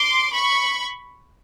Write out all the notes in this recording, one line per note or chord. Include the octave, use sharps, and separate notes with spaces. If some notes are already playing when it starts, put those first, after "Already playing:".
Already playing: C6 D6
B5 C#6